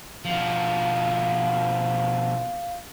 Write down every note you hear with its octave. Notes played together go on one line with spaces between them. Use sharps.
B2 F3 F5